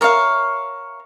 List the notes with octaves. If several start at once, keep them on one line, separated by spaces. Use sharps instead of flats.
A#4 C#5 E5 F5